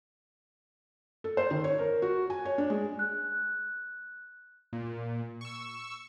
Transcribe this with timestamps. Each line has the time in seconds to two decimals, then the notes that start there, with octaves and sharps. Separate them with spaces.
1.24 A4
1.37 C5
1.51 D#3
1.64 C#5
1.79 A#4
2.02 F#4
2.30 G#5
2.45 C#5
2.58 D4
2.70 G#3
2.99 F#6
4.73 A#2
5.41 C#6 E6